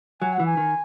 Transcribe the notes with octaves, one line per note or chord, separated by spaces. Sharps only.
F#3 G#5
F#5
E3
G#5
D#3